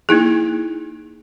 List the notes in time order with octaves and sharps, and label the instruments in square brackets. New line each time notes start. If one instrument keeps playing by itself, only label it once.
[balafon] A#3 D#4 E4 G#4